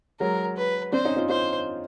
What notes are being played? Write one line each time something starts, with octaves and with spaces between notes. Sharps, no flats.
F#3 G#3 A#4
B4
C4 D4 C5
C#4 D#4
D#4 F4
D#4 F4 C5